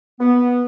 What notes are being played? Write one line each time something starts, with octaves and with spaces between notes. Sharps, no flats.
B3